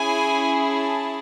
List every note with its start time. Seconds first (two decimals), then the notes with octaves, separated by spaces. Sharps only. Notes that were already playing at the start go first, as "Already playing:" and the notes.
Already playing: C#4 E4 G#4 G#5
0.69 A5